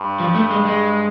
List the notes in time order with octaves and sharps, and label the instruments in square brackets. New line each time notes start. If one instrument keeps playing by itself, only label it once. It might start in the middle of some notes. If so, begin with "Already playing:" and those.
Already playing: [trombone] G2
[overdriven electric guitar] F3
A3
G#3
G#3